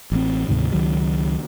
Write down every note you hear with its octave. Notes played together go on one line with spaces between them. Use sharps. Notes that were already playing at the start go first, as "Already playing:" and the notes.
A1 C4
D2 G#2 C3 D#3
C#2 D#3 F#3